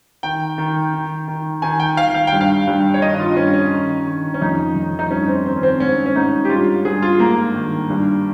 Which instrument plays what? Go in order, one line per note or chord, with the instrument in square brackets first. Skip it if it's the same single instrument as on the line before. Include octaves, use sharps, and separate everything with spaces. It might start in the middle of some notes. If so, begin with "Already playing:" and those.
[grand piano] D#3 G5
D#3
D#3
D#3
D#3 G#5
G5
D#3 F5
F5
G5
G2
F5
G2
C#5
D#3 D#5
F4
G2 C#4
C#4
D#3
D#3
C#4
F2 D#4
F2
D#4
G2 C#4
C4
D#3 C4
C#4
C4
G#2 C#4
C#4
G#2 D#4
G4
G2 F4
G2 G#4
F4
G#2 A#3
D#3
G2